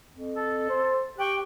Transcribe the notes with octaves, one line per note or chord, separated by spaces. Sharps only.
F2
A4
C5
G4 G5 C#6 F#6